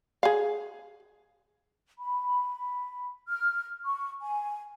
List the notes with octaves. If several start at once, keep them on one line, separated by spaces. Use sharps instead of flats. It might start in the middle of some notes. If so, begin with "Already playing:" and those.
G#4 F5
B5
F6
C#6
G#5